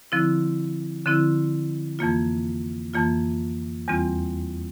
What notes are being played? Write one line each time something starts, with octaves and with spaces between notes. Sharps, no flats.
D3 F3 C4 E4
D3 F3 C4 E4
F2 E3 A#3 F4
F2 E3 A#3 F4
E2 E3 G3 C4 F4